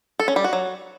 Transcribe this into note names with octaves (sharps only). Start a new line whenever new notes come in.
A4
C#4
G3
F#4
F#3